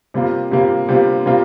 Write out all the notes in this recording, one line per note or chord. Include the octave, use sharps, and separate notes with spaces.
C3 G3 A#3 F4
C3 G3 A#3 F4
C3 G3 A#3 F4
C3 G3 A#3 F4